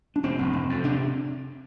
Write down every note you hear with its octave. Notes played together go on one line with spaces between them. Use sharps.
D4
F1 C4
F1
F1
F2
C3 D4